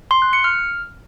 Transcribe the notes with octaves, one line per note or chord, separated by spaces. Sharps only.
C6
F#6
C#7
F6